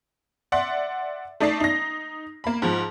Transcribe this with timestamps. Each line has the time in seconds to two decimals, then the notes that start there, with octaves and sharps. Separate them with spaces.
0.52 D5 E5 F#5 C6
1.40 A3 D#4 D5 E5 A5 C7
1.60 D#4 A#6
2.44 A#3 B5
2.62 G#2 F3